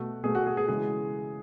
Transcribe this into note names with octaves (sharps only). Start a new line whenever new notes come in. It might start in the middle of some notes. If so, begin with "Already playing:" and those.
Already playing: B2 A3 F#4
B2 A3 G#4
F#4
G#4
G#4
C#3 E3 G#3 G#4